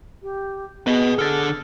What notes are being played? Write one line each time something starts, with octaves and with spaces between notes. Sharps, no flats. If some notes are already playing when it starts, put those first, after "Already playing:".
G4
B3 G#4 B4 D#5
D3 A4 F6 A6